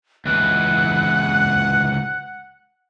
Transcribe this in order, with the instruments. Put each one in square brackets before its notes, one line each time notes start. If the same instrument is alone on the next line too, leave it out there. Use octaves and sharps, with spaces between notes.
[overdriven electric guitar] C#2 E3 [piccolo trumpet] F#5 [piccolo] F#6